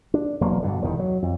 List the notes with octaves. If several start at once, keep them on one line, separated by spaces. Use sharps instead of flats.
D4
E1 F#3 A#3
G2 B2 D3
E1 E2 G2 D#3
F#3
F2